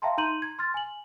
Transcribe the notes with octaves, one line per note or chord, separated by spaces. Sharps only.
E5 F5 G5 A5 A#5 C6
D#4 A#5 C6 G6 D#7 F#7
G#6
C6 F6 A6
G#5 F#7